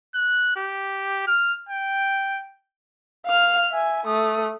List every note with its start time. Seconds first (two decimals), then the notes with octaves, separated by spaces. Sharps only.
0.15 F#6
0.57 G4
1.27 F6
1.69 G5
3.26 F5 F6
3.71 E5 G#5
4.06 A3 D#6